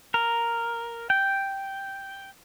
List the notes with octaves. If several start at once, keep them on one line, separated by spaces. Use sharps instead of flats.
A#4
G5